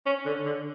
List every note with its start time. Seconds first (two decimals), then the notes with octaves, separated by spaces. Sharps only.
0.06 C#4
0.26 D3
0.46 D3